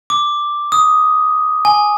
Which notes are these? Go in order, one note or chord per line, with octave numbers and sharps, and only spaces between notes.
D6
D#6
G#5